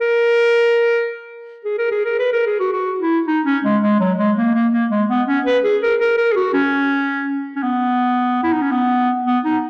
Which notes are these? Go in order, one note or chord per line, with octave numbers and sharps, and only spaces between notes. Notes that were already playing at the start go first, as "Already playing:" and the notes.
A#4
G#4
A#4
G#4
A#4
B4
A#4
G#4
F#4
F#4
E4
D#4
C#4
G#3
G#3
F#3
G#3
A#3
A#3
A#3
G#3
B3
C#4
B4
G#4
A#4
A#4
A#4
G#4
F#4
C#4
C#4
B3
E4
D#4
C#4
B3
B3
D#4